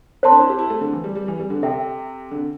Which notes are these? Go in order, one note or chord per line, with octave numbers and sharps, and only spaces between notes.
C4 C5 A5 C6
D4
E4
G4
E4
A3
D3
E3
G3
G3
E3
G3
D3
C3 A4 E5 G5
D3